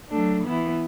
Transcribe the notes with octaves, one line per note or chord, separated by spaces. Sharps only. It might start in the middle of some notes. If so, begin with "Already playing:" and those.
F#3 A3 D4
E3 B3 E4